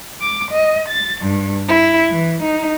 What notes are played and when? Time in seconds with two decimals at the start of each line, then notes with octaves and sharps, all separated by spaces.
0.21 D6
0.52 D#5
0.89 A6
1.22 G2
1.69 E4
2.10 E3
2.44 D#4